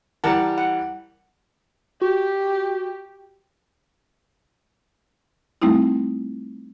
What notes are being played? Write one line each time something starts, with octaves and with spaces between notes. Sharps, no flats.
E3 G3 A#4 F#5 A5
F#5
F#4 G4
G3 A3 C4 D#4 E4